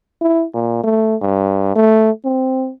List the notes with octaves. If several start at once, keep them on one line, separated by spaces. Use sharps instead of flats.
E4
A#2
A3
G2
A3
C4